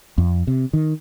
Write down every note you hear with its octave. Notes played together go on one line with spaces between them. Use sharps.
F2
C3
D#3